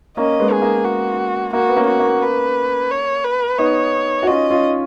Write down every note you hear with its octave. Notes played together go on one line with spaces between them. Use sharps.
A#3 C#4 D#5
G#3 B3
G#4
A#3
F#4
A#3 F#4
B3
A#3 C#4
F#4
A#3
B4
C#5
B4
B3 D#4 C#5
F#4
C#4 F4 D#5
C#4 F4